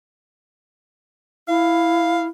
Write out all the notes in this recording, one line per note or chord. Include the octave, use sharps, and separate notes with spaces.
E4 F5